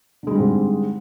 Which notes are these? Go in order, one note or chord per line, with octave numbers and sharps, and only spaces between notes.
G#2 D3 G3 G#3 C4